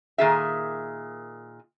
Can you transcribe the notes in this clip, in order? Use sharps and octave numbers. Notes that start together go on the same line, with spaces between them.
A#2 D#3 G#4 E5